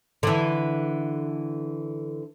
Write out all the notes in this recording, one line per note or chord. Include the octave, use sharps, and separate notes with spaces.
D3 E3